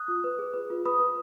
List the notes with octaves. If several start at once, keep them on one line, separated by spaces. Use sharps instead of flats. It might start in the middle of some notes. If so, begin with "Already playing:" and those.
Already playing: D#6 F#6
F4
B4
G#4
B4
F4
B4 B5 D#6
B4